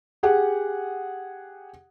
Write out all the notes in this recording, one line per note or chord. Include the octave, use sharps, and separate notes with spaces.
G4 G#4 F#5